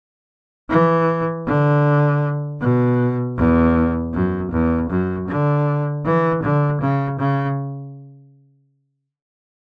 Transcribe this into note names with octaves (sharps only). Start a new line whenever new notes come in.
E3
D3
B2
E2
F#2
E2
F#2
D3
E3
D3
C#3
C#3